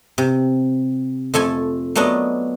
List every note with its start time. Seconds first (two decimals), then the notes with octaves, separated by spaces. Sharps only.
0.18 C3
1.34 F2 A3 A4 G#5
1.95 F#3 A3 B3 D4 D#5